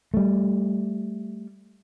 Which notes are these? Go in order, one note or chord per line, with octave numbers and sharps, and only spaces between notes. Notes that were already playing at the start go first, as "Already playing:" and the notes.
G3 A3